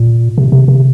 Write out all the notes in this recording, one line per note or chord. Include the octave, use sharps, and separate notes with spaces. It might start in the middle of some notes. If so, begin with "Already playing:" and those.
Already playing: A#2
C3
C3
C3